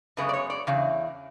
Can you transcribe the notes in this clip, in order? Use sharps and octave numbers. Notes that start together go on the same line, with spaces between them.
F#2 C#3 G#3 B3 B4
D5
C#5
D5
E2 C#3